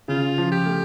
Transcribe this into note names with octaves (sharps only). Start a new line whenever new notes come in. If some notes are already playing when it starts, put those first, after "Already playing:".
C#3 F4
F3
G4
A3